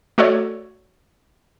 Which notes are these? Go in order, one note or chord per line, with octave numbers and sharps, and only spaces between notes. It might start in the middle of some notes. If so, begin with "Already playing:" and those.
A3 F#4 A4 C#5 D5